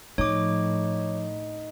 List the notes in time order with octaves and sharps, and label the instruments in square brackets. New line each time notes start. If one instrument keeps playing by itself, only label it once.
[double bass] A2 [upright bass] F3 [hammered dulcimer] D#4 [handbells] C#5 D6